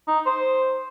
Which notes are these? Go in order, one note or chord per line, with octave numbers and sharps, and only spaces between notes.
D#4
C5